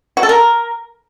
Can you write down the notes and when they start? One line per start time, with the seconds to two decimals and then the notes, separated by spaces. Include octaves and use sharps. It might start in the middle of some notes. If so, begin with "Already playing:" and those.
0.17 F#4
0.23 A4
0.29 A#4